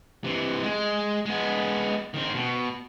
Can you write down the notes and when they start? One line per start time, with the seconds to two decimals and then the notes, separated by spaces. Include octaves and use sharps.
0.24 C3 E3
0.63 G#3
1.26 G#3 B3
2.14 D#3 C4
2.35 B2